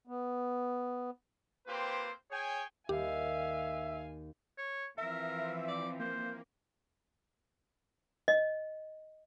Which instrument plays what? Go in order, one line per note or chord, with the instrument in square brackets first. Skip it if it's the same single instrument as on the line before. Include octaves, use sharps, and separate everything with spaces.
[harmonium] B3
[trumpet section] A#3 C4 F4 G4 B4 C5
G#4 C#5 G5 G#5
[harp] D#2 [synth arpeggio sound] G4 [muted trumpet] E5 [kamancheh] F5 G#5
[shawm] C#5
[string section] E3 F3 C4 [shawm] A#4 [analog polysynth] E5
[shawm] D5
[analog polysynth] A#3 [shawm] C5
[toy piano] D#5